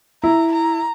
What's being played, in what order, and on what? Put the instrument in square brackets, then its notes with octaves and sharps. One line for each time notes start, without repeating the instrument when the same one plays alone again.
[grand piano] E4 [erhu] A#5
[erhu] A#5